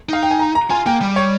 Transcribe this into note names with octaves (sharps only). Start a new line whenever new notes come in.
D#4 F5
G5
G#5
A#5
A#5
F4 G#5
A#3 G5
G3
C#5